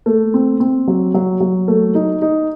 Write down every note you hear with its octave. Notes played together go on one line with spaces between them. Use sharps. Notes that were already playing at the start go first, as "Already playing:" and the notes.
A3
C4
C4
F#3
F#3
F#3
A3
D#4
D#4